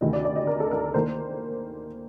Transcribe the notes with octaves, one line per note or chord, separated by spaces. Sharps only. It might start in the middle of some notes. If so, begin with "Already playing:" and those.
D2 C3 D#3 A3 D#5
D5
D5
D#5
A#4
A4
A#4
D#3 A#3 C5